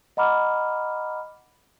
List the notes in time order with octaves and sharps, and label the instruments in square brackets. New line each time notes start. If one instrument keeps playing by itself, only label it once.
[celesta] D#5 F#5 A#5 B5 D6 F6